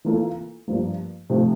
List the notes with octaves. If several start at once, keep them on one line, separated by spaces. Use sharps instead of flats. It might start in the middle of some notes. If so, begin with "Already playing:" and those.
E3 A#3 F4 A4
G2 F3 A#3
C3 F3 A3